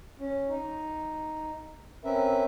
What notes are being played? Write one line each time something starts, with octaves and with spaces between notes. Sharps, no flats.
C#4
D#4
C4 C#4 A#4 B4 E5